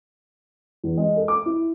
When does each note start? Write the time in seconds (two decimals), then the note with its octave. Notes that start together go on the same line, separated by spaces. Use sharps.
0.84 E2
0.97 G#3
1.16 A4
1.28 D6
1.46 E4